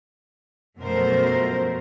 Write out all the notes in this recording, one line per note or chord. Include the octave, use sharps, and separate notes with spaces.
F#2 B2 F3 A3 A#4 C5